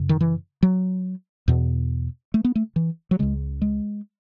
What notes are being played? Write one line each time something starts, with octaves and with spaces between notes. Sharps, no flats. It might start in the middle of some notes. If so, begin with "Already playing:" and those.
Already playing: F#2 C#3
D#3
E3
F#3
E2 B2
A3
B3
A3
E3
F#3
C#2 C#3 G#3
G#3